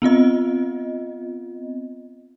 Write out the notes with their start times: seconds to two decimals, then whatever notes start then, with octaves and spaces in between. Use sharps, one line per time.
0.02 B3 C4 F4 D#5